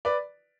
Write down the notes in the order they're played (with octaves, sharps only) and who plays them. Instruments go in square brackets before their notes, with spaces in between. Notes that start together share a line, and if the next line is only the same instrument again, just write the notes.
[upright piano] B4 D5